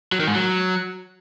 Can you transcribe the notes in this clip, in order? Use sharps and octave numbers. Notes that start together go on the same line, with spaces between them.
F#3
D#3
G#2
F#3